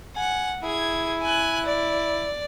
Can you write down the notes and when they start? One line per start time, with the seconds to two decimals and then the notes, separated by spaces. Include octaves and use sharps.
0.16 F#5 G#5
0.63 E4 G#4 G#6
1.22 G#5 F#6
1.66 D5